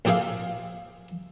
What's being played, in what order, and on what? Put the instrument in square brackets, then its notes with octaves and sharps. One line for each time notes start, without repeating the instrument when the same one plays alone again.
[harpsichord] A#1 C4 G4 G#4 E5 F5